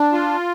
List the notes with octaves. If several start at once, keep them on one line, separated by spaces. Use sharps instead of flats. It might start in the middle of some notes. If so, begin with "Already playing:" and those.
Already playing: D4
F4